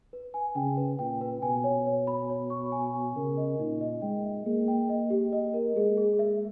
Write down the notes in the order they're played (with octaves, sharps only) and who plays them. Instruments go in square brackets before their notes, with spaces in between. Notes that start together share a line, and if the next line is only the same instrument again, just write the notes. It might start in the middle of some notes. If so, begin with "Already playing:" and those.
[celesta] B4
G#5
[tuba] C#3 [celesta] G5
[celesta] B4
[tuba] A#2 [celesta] G5
[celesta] B4
[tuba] B2 [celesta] G#5
[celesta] C#5
C#5
B5
C#5
C#6
G#5
G#5
[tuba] C#3 [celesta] A#4
[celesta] D#5
[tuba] A#2 [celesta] D#4
[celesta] D#5
[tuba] G#3 [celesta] G5
[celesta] E5
[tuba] A#3 [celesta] G#4
[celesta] G5
D#5
G4
D#5
A#4
[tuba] G#3 [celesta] G#4
[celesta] G#4
E5